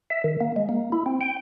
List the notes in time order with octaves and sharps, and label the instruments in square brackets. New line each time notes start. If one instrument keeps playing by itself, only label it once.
[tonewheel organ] E5
D#3
A#3
G#3
A#3
E4
C4
G5